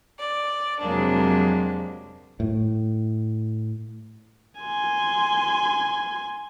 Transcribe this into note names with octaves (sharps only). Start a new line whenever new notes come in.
D5
F2 C3 F#3 G#3 A#3 D4
A2
G#5 C6